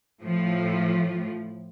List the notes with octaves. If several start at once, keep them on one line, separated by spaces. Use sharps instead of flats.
A2 F3